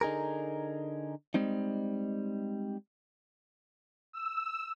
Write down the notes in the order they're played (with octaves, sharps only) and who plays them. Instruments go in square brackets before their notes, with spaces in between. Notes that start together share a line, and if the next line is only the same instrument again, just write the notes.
[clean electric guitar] D3 D#4 G#4 A#4
G3 G#3 C4 D#4
[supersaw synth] E6